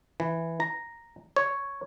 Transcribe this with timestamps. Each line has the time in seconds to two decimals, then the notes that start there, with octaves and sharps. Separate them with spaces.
0.20 E3
0.60 A#5
1.36 C#5